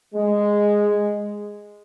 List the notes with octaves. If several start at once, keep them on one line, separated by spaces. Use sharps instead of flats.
G#3